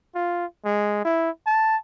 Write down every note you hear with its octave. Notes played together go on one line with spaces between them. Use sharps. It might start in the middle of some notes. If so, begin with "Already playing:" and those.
F4
G#3
E4
A5